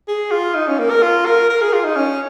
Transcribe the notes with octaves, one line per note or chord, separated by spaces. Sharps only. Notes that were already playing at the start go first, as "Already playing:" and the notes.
G#4
F4
D#4
C#4
A#3
A#4
F4
A#4
A#4
G#4
F4
D#4
C#4